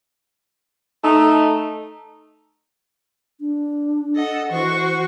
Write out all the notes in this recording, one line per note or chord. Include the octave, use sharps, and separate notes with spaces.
A3 D#4
D4
A4 D#5 F#5
E3 F#4 C5 C#6